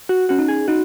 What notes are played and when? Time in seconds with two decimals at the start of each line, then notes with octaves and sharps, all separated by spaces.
0.09 F#4
0.29 C#4 F#4
0.39 D#4
0.48 G#4
0.68 D#4 F#4